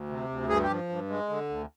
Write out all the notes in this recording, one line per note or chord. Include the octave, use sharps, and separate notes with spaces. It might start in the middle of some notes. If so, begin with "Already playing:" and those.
Already playing: D2
C3
D2
G2 G#4
G4
F3
G2
G#3
D3
D2